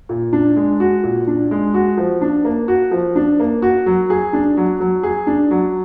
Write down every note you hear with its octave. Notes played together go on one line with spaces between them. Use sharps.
A#2
D4
G#3
F#4
A#2
D4
G#3
F#4
F3
D4
A#3
F#4
F3
D4
A#3
F#4
F#3
G#4
D4
F#3
F#3
G#4
D4
F#3